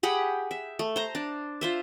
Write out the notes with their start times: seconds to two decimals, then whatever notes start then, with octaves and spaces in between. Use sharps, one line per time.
0.03 G4 G#4 F#5 B5
0.51 E5
0.79 A3
0.96 C5 A#5
1.15 D4
1.61 F4 C5 E5